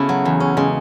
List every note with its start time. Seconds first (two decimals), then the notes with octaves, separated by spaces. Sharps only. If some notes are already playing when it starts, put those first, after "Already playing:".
Already playing: C#3 A3 B3 E4 F#4
0.09 F#3
0.25 E2
0.40 C#4
0.57 C#3 G#3